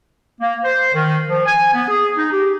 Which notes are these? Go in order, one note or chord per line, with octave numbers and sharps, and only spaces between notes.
A#3
C5
D#3
F3
G#5
B3
G#4
D#4
G4